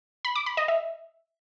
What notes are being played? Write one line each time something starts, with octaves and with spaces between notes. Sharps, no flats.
B5
D6
B5
D#5
E5